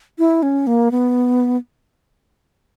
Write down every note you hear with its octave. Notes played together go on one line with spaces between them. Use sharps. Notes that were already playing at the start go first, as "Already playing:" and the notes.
E4
C#4
A#3
B3